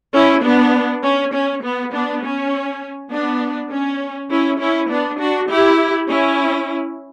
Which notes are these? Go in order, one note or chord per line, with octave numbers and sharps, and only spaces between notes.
C#4 E4
B3 D4
C#4
C#4
B3
B3 D4
C#4
B3 D4
C#4
C#4 E4
C#4 E4
B3 D4
D4 F#4
E4 G4
C#4 E4